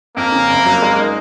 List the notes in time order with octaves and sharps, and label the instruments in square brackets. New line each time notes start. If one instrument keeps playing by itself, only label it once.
[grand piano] F2 [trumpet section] A#3
[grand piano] C#3
F#1
F#3
G#3
D#4